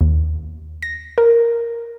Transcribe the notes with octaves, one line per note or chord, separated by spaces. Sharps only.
D#2
A#6
A#4